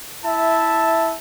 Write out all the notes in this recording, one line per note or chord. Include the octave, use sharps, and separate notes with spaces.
E4 E5 A5